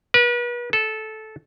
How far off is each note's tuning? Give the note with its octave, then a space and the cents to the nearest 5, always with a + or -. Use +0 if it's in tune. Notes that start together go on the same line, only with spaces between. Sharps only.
B4 -40
A4 -15